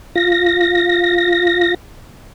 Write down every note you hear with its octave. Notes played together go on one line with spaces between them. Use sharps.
F4 A#6